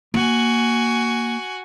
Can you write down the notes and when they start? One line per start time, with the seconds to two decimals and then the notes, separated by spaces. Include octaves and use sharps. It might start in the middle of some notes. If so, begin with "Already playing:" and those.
0.14 A#3 F#4 G#5